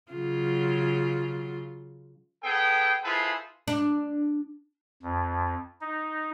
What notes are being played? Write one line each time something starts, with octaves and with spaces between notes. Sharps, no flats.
C#3 F#3 F4
B3 G#4 A4 G5
E4 F4 G#4 A4 B4 C5
D4
F2
D#4